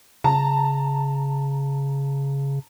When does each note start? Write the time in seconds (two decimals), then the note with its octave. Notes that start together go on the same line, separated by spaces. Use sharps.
0.24 C#3 A5 A#5